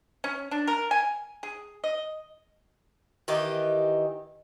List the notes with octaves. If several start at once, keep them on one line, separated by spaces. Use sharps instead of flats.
C#4
D4
A#4
G#5
G#4
D#5
D#3 E3 G4 D#5